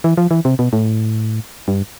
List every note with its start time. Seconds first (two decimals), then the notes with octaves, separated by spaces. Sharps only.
0.04 E3
0.17 F3
0.31 E3
0.45 C3
0.59 B2
0.73 A2
1.68 G2